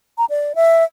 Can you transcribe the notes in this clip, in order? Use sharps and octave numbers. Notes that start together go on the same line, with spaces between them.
A#5
D5
E5